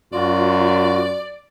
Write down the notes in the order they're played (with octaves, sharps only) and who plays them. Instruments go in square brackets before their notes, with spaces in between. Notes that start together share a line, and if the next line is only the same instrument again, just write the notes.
[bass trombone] F#2 [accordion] F4 F#4 [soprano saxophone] D5